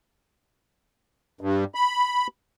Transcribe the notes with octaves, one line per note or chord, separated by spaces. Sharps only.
G2
B5